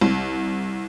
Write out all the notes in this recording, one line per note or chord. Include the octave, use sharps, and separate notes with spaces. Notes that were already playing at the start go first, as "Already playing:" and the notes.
C2